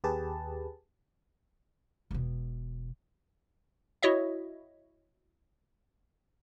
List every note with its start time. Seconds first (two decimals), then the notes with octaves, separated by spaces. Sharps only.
0.04 D#2 G4 G#4 B4 A5
2.11 E1 B2
4.03 E4 F#4 C#5 D#5 E5